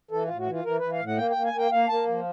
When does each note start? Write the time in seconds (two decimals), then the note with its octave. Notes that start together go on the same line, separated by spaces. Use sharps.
0.11 E3 A4
0.25 A2 F4
0.39 F#4
0.47 E3 F4
0.64 E3 A#4
0.79 E3 B4
0.92 F5
1.00 A2
1.07 F#5
1.17 A#3 G5
1.31 G5
1.36 A#3
1.45 G#5
1.53 A#3 G5
1.71 A#3 F5
1.88 A#3 A5
2.07 F3